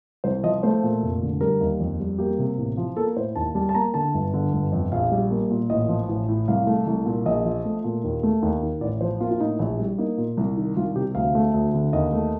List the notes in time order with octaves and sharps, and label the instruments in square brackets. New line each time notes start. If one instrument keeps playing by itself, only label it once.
[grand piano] C2 C5
F3 D#5
A3 C5
A#2
F1
D3
G3 A#4
D#2
F2
G3
A#3 G4
C3
A1
F3
A#3 A4
A2 C5
D#2 A5
G3 A5
A5
A#3 A#5
D3 A5
G1
D3
G1
F2
A#1 F5
G3
A#3
A#2
A1 D#5
F3
A1
A2
C2 F5
A3
C2
A#2
A#1 D#5
F3
A3
A#2
D#2
A3
D#2
D#3
A1 D5
F3 C5
A#3 F4
F4
A2 D#4
A#1
G3
A#3 D#4
A#2
C2
D#3
C2 F4
C3 G4
D2 F5
A3
D2
D3
D#2 D#5
A3